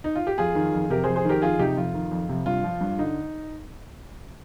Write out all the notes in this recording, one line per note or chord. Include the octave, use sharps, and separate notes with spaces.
D#4
F4
G4
F2 F4 G#4
D#3
F2
C3 G4 A#4
F2 G#4 C5
G#4 C5
D#3 G4 A#4
F2 F4 G#4
C3 D#4 G4
F2 F4
D#3
F2
C3
G2 F4
F3
G2
D3 D#4